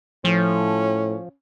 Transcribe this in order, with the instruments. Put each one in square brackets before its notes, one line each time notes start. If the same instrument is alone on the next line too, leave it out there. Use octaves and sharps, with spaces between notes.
[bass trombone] A2 [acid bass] F3 [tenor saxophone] C#4